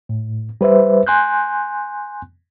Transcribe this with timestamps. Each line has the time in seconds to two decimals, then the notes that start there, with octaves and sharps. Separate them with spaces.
0.09 A2
0.61 G3 B4 C5 E5
1.07 G#5 C6 F#6 G6